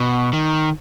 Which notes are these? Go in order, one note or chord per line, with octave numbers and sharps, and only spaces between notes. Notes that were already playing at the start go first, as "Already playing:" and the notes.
Already playing: B2
D#3